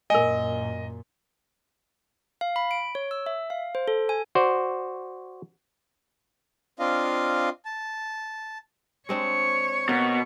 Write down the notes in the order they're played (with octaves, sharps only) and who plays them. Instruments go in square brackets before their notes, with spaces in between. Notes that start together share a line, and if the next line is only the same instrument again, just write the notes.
[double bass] F#2 A#2 [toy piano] A#4 G#5 [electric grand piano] D#5
[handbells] F5
B5
D7
C#5
E6
E5
F5
C5
A4
G#5
[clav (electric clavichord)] F#4 C5 D5
[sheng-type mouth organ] C4 D4 F4 D#5 F5
A5
[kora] G#3 C4 D4 [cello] C#5
[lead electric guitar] B2 [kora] A#3